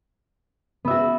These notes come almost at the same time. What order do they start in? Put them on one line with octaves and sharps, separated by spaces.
B3 E5 F#4